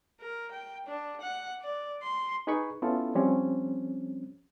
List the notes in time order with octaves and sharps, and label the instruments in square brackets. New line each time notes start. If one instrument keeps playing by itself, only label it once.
[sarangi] A#4
G5
D4
F#5
D5
C6
[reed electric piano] D#4 G#4 B4 B5 C#6
B3 C#4 E4 F4 A4
F3 G3 C4 C#4